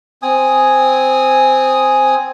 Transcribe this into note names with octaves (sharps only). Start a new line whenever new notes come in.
C4 G#5 D#6